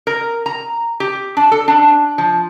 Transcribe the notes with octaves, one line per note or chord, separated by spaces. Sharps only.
A#4
A#5
G4
D4
A4
D4
F3